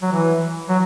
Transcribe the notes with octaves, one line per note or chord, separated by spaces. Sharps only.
F#3
E3
F#3